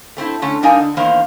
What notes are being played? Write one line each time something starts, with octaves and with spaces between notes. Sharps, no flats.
A3 C4 D#4 E4
D3 A3 C#4
G3 D4 D#4 A#4 F5 G#5
D3
E2 D#3 A#3 D4 C5 F5